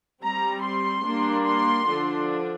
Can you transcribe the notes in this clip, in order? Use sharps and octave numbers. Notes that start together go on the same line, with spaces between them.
G3 C4 A#5
C6
G3 A#3 D4
C6
D3 F3 D4